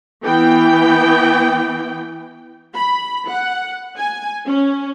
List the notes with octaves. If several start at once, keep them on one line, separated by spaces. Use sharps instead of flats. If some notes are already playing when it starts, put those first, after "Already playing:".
E3 B3 G5
B5
F#5
G#5
C#4